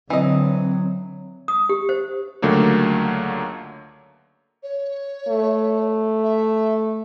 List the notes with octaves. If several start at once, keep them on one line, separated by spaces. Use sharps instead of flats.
D3 E3 F#3 C4 D#5
D#6
G4
C5
C#2 D3 F#3 A3 A#3
C#5
A3
E5